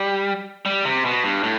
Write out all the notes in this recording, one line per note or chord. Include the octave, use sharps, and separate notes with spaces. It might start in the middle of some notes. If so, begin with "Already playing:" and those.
Already playing: G3
G3
C3
B2
G2
A2